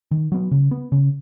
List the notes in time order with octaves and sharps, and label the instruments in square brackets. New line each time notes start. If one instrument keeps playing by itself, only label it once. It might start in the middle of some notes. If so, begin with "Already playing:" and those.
[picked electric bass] D#3
F#3 B3
C#3
B3
C#3